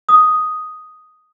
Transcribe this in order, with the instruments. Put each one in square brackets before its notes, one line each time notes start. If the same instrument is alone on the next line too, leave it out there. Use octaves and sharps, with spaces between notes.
[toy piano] D#6